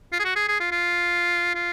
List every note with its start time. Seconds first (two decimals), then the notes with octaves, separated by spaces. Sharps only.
0.13 F4
0.20 G#4
0.25 F#4
0.36 G#4
0.48 G#4
0.60 F4
0.72 F4
1.55 F4